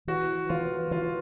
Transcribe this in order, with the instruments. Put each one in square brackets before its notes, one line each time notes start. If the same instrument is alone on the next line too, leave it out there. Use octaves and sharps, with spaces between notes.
[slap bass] E3 [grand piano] F#4
[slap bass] E3 [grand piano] F4
[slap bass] E3 [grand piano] F4